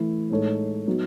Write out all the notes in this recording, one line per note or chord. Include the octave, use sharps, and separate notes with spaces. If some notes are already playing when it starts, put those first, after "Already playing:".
Already playing: E3 A3 E4
A2 G#3 D#4 A4 C#5
F#3 B3 D#4